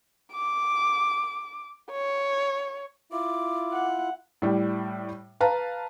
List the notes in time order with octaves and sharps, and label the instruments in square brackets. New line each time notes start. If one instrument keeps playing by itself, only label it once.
[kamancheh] D6
C#5
[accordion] E4 F4 [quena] D6
[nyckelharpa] F#5
[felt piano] A2 G3
B4 F5 A5 A#5